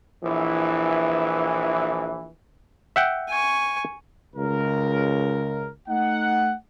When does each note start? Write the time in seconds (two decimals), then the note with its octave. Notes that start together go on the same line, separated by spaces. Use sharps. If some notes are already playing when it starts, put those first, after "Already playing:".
0.24 A#1 E3
2.96 E5 F#5 G5
3.29 G#5 C#6
4.36 C#2 A#4
5.89 A3 D#4 F#5